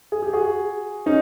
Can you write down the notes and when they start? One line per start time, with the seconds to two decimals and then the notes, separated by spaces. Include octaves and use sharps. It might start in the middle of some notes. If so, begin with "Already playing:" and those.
0.12 G#4
0.22 G4
0.33 F#4 G#4
1.06 C#4 D#4